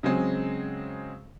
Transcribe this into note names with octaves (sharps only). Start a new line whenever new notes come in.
C#3 F#3 G#3 C4